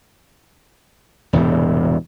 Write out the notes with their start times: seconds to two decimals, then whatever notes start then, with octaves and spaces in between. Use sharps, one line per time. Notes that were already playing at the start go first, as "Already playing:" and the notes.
1.33 E1 E2 A2 C3